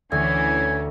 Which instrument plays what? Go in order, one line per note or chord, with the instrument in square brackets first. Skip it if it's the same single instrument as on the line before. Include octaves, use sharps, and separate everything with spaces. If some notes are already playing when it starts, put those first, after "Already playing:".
[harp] D2 [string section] E3 C#4 [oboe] G#5